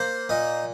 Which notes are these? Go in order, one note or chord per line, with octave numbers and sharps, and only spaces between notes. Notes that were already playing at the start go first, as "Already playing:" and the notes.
Already playing: A#3 C5
A#2 D#4